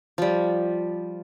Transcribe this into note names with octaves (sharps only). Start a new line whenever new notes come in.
F3 G3